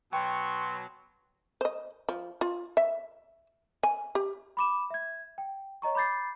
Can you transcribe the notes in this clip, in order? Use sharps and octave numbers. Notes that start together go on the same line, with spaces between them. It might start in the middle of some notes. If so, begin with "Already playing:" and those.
B2 F#3 G5 C6 C#6
C5 D#5
F3
F4
E5
G#5
G4
B5 D6 E7
E5 G#6
G5
C#5 D#5 A#5 C#6
B5 D6 G6 A6 C7